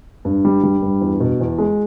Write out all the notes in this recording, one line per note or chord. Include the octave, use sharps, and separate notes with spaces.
G2
G3
G3
G2
E2
B2
E2
G#3